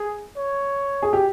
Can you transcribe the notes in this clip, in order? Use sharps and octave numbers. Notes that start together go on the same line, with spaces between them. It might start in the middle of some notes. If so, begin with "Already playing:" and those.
Already playing: G#4
C#5
G#4
G4